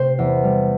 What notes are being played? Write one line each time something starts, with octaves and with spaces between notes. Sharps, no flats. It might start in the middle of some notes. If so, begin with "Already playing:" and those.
Already playing: C3 A3 C5
E2
G3